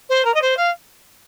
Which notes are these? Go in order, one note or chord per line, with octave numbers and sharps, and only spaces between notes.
C5
A#4
D#5
C5
F5